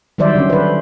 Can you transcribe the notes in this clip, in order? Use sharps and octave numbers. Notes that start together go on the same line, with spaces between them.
D#3 F#3 G3 C5 D5 E5
D3 C#4
B4 C5